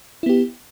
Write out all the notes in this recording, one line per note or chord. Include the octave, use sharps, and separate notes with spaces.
B3 E4 G4